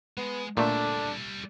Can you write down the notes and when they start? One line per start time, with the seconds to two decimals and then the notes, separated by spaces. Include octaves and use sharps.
0.17 G#3 B3
0.57 A#2 D3 G3 A3 D4 E5